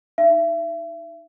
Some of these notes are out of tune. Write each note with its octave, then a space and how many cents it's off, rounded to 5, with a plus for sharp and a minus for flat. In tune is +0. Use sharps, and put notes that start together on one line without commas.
D#4 +0 E5 +35